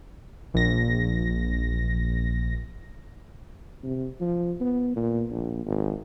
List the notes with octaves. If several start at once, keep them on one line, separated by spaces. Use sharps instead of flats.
A#1 A#6
C3
F3
B3
A#2
A#1
G#1